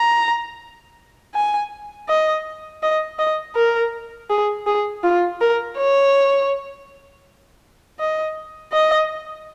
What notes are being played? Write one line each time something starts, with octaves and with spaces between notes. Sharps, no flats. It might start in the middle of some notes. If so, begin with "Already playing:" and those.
Already playing: A#5
G#5
D#5
D#5
D#5
A#4
G#4
G#4
F4
A#4
C#5
D#5
D#5